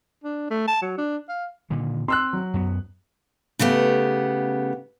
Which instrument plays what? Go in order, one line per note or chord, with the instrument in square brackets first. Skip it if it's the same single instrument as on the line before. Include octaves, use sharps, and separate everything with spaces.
[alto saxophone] D4
A3
A5
F#3
D4
F5
[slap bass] A#2 D3 D#3
[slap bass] C4 [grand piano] C6 E6 F#6
[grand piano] F#3
[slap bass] F#2 B3
[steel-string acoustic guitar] C#3 A3 B3 G4